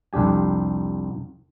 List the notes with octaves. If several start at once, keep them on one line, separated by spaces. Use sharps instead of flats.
C2 F2 D4 G4 G#5